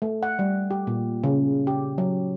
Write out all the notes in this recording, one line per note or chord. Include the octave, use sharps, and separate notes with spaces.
A3
F#5
G3
G4
A#2
C#3
G4
F#3